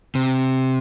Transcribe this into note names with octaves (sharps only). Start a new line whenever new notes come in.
C3